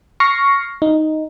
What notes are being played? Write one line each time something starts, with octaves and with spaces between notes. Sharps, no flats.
C#6 F6 A#6 C7 C#7
D#4